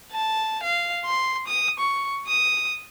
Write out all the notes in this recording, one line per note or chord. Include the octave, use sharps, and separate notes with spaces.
A5
F5
C6
D#6
C#6
D#6